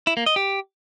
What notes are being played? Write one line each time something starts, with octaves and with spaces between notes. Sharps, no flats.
E4
A#3
D#5
G4